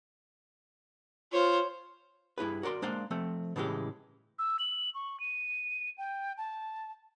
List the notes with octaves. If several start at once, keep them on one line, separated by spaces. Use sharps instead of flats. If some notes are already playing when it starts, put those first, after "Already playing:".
F4 C5 C#5
G2 E4 G#4 B4
F#4 A#4 D5 C6
G#3 A#3 D4 C5 F5
F3 A3 C4
A2 C#3 E3 G#3 G4
E6
F#7
C#6
D#7
G5
A5